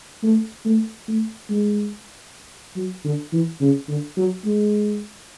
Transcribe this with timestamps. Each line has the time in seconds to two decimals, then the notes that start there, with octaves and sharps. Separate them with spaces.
0.23 A3
0.65 A3
1.08 A3
1.49 G#3
2.76 F#3
3.05 D3
3.33 E3
3.61 C#3
3.88 D3
4.17 F#3
4.45 G#3